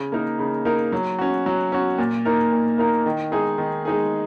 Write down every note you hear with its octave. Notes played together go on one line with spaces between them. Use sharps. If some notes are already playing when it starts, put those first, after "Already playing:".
Already playing: C#3
A#3 D#4 A#4
C#3
A#3 D#4 A#4
F#3
C#4 F#4
F#3
C#4 F#4
A#2
A#3 D#4 A#4
A#2
A#3 D#4 A#4
D#3
G#3 D#4 G#4
D#3
G#3 D#4 G#4